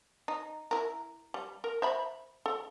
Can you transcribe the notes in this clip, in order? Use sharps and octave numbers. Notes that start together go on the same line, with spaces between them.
D#4
E4 A#4
G3
A#4
C5 E5 B5
A4